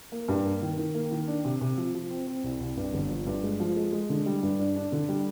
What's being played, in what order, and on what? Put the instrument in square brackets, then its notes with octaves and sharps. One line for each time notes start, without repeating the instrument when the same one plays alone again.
[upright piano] A#3
G2
A#3
D#3
D#3
A#3
D#3
D4
C3
C3
F3
F3
C4
C4
C2
C2
G2
G1
F3
G2
G#3
F3
G#3
G#3
D3
G3
G2
D4
D4
D3
G3